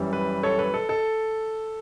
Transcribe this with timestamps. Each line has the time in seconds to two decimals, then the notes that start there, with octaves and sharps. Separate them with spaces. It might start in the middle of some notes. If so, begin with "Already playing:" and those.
Already playing: F#2 E3 G3
0.13 B4
0.43 A4 C#5
0.59 B4
0.74 A4
0.89 A4